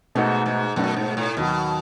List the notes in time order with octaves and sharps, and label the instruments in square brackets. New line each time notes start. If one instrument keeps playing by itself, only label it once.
[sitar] G#2 [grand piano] B2 A3 D#4 F#4 A4
[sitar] G#2
[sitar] F#2 [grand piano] B2 A3 D#4 F#4 A4
[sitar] G#2
A2
[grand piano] D#2 D#3 F#3 [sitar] B2